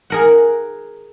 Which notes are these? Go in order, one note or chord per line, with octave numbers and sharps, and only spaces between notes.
G#4 A#4 F#5